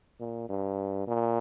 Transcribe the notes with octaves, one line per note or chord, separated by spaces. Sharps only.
A#2
G2
A#2